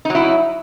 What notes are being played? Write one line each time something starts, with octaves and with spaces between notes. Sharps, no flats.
F#3 D#4 E4